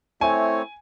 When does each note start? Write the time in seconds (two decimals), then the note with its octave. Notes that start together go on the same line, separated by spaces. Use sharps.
0.21 A3 C4 E4 C#5 G#5